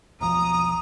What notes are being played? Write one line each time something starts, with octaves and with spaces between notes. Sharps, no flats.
E1 B1 F3 A#5 D#6